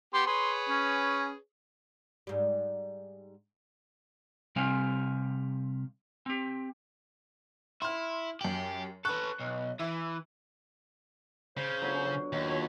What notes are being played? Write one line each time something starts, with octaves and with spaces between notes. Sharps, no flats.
B3 G4 C6
G#4 B4 C#5 C6
C#4
G#2 G3
C3 G3 C4 F5 G#5
C4 G4
E4 C6 F6
F#2 G4 F#7
A4 B4 C#6 F#6
B1
E3 E5
C#3 C5
B2 D3 F#3
F#3
D#2 F#3 F4
C#5